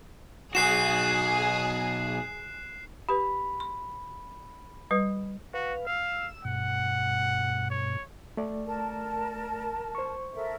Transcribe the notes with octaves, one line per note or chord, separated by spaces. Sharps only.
B1 F#4 G#4 F#6 C7 E7
G4 B4 B5
C6
G3 B4
F#4 B4 F5
F5 E6
G2 B2 F#5
C#5
A3 D5
A#4 A5
C5 C#6
A4 A#4 E5